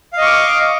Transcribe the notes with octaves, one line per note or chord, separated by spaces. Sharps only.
D#5 F5 C#6 D6